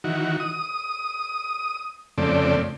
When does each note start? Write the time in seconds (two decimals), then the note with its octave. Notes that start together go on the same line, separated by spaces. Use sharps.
0.04 D#3 E3 F#4
0.40 D#6
2.18 F2 C#3 A3 C4 D5